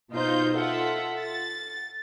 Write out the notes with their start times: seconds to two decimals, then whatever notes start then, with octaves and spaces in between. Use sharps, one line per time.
0.11 B2 D#4 F4 C5 G6
0.54 F4 A4 E5 F#5
1.19 A6